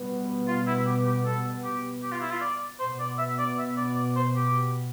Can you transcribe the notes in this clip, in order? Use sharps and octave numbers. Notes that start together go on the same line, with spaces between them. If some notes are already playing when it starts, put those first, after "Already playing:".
Already playing: B2 G3 B3
F4
E4
G4
G4
A4
G4
G4
F4
E4
F4
D5
B2 B3 C5
D5
E5
D5
E5
D5
D5
C5
G4